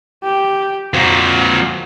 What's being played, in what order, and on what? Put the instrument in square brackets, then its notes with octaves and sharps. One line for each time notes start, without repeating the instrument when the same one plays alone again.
[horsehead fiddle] G4
[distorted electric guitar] F2 A#2 [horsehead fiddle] F#4